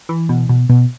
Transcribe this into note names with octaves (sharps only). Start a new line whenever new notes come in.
E3
B2
B2
B2